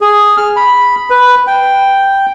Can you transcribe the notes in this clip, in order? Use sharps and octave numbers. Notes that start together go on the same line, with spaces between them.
G#4
F6
B5
B4
G5